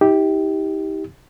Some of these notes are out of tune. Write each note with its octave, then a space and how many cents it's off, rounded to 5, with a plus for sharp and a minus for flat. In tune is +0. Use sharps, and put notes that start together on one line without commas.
D#4 +45 G4 +0